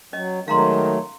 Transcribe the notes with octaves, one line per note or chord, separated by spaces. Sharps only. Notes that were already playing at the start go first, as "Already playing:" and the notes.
F#3 C#4 D#5
D#3 F#3 G#3 A3 F5 A#5 C6